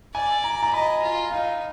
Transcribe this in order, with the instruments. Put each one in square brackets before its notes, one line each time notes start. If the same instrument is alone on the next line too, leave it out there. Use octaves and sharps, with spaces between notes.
[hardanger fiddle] D5 [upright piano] G#5
[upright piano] A#5
A#5
[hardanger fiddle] D#5 [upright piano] B5
[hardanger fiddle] F4
[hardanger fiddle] D#4 [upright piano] F5